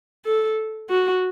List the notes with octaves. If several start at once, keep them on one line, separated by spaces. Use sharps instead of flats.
A4
F#4